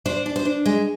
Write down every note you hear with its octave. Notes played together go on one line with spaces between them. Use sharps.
D4 C5
D4
C5
D4
G#3